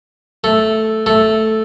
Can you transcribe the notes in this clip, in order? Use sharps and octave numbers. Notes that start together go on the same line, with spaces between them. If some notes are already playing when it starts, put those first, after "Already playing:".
A3
A3